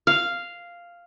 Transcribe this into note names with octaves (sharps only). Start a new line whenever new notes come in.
F5